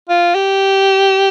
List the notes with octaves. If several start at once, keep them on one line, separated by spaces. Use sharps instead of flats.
F4
G4